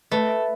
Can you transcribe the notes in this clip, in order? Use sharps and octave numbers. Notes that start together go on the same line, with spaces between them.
A3 B4